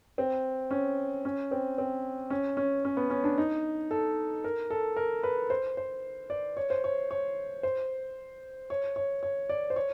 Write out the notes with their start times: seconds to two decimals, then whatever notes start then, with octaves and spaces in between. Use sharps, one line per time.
0.18 C4
0.71 C#4
1.25 C#4
1.51 C4
1.78 C4
2.30 C#4
2.57 C#4
2.85 C#4
2.97 B3
3.10 C#4
3.24 D4
3.38 D#4
3.91 A4
4.44 A#4
4.70 A4
4.97 A#4
5.23 B4
5.50 C5
5.77 C5
6.30 D5
6.57 C#5
6.70 C5
6.84 C#5
7.11 C#5
7.63 C5
8.70 C#5
8.96 C#5
9.23 C#5
9.49 D5
9.70 C5
9.76 C#5